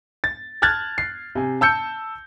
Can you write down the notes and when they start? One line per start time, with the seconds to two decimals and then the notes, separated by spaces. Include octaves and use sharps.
0.24 A6
0.62 A5 F6 F#6 G#6 A6
0.98 C7
1.35 C3 G#5
1.61 A5 E6 G6 C#7